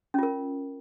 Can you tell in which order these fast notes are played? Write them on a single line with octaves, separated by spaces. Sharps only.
C#4 F4 A#4